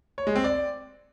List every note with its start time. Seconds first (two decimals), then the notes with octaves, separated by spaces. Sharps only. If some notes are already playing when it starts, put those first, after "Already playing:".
0.18 C#5
0.27 G#3
0.35 C4
0.44 D5